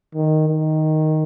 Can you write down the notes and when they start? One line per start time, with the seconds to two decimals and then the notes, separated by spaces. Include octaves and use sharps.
0.15 D#3
0.48 D#3